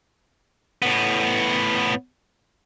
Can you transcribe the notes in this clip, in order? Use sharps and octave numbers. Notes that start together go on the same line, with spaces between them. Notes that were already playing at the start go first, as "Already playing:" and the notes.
A2 B3